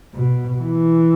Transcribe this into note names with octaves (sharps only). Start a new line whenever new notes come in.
B2
E3